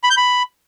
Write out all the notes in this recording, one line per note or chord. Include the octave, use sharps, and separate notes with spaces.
B5
G6
B5